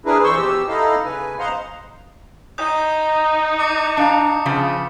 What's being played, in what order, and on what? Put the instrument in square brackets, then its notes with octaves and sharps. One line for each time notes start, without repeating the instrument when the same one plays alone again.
[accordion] D4 E4 G#4 A#4 B4
F2 E3 C5 C6 C#6 E6
B2 G4 E6
D#4 E4 A4 D#5 F5
C#3 B4 G#5
C5 D#5 F5 F#5 A#5 C6
[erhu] D#4 [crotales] D#6 G6
[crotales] D6 C#7
[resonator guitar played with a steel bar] D4 F5 A#5
C#3 F3 B3